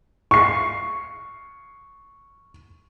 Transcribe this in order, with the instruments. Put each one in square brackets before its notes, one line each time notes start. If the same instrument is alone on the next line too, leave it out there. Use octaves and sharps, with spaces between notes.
[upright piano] C#6 C7